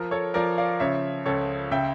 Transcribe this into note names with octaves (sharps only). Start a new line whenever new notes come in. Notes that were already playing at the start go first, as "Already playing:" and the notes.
Already playing: F3 A#4
A4 C#5
F3 A#4 D5
D5 F5
C#3 C#5 E5
C#2 A4 C#5
C#3 E5 G5